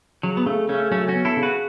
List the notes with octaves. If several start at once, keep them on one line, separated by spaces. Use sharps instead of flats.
C#3 F#3
B3
C#3 A3
C#3 A3 C#4
F#3 A3 C#4
C#4 F#4
B3
E4 A4
C#3
F#4 B4